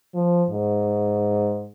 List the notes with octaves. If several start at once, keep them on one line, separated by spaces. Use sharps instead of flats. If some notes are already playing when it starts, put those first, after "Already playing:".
F3
G#2